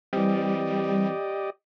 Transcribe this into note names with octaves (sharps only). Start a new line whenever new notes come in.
E3 G3 C4 G4 D5 D#5